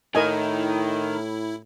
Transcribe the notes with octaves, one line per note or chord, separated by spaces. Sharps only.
A2 D#3 E4 A#4 D#5 G#5